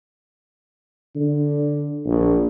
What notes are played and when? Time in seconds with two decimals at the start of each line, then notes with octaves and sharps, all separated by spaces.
1.16 D3
2.05 A#1